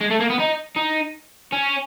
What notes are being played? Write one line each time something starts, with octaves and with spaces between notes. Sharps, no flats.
G#3
A3
A#3
B3
D#4
D#4
C#4